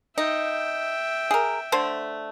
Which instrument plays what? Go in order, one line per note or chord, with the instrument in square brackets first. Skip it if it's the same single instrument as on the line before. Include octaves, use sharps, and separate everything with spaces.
[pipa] D#4 [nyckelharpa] E5 G5
[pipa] G#4 A#4
D3 A3 C5